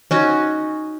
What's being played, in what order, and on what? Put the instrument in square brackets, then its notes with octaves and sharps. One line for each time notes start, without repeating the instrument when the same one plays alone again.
[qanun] C#4 D#4 F#4